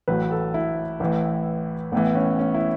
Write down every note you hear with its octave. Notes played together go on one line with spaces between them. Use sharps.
A1 A2 F#3 B4
A4
E4
A1 A2 E3
A1 A2 E3 B3
C#4
C#4
E4